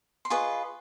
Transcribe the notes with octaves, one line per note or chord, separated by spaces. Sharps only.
C6
F4 G#4 B4 D#5 C#6